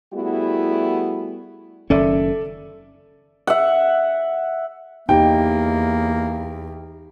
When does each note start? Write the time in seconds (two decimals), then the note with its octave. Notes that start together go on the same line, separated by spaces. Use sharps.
0.13 G3 A3 B3 E4 F#4 G#4
1.90 F#1 D#3 C#4 A4 D5 E5
3.47 E5 F#5
5.09 E2 A#3 D#4 G4 G5